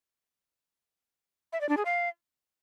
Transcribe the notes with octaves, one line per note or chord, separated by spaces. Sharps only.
E5
D5
D4
G#4
F5